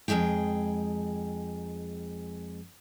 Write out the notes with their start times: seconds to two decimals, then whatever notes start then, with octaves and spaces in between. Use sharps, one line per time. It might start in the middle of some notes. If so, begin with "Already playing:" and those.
0.08 F2 G3 G#3 G#4 G5